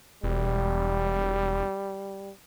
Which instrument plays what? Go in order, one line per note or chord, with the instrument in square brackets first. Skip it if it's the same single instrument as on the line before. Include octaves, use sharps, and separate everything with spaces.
[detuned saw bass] E1 [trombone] G3